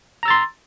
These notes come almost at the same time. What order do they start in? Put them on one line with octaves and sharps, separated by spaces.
A#5 E6 A6 C6